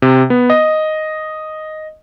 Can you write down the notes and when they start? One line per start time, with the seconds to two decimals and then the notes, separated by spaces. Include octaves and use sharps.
0.02 C3
0.30 B3
0.50 D#5